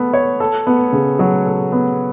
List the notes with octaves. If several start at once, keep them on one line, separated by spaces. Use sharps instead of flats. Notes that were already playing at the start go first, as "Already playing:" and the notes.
Already playing: B3 A4
C#5
A4
B3
C#3
F#3
A4
B3